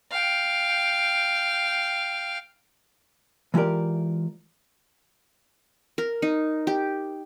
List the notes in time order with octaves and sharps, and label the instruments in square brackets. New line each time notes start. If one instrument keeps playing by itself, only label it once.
[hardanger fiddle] F5 G5
[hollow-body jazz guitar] E3 G#3 F4 G4 A#4 D5
[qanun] A#4
D#4
G4